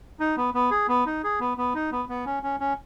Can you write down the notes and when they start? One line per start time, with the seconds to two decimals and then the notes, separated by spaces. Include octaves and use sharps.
0.20 D#4
0.37 B3
0.54 B3
0.71 G#4
0.88 B3
1.06 D#4
1.24 G#4
1.40 B3
1.57 B3
1.74 D#4
1.92 B3
2.09 B3
2.26 C#4
2.43 C#4
2.60 C#4